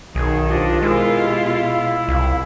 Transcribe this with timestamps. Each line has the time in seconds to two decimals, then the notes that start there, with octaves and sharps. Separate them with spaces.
0.15 B1 D#3 G#4
0.50 D4 F4 G4 C5 D#5
0.82 B2 G#3 E4 F4 A#4
1.17 G4
1.47 F5
2.08 C2